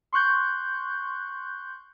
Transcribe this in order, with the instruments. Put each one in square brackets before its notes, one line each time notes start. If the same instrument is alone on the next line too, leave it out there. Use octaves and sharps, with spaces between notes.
[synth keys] C6 C#6 F#6 G6